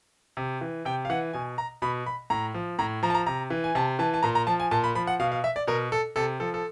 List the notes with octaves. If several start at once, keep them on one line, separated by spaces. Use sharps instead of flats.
C3
E3
C3 G5
F5
E3 F#5
B2 G#5
A#5
B2 B5
B5
A2 A#5
F3
A2 A#5
F3 A#5
A5
A#5
C3 A#5
E3
G#5
C3 A5
E3 A5
A5
A#2 A#5
A#5
F3 A5
G#5
A#2 A5
B5
F3 B5
F#5
B2 F5
F5
E5
D5
B2 A#4
A4
C3 A4
F3 A4
A4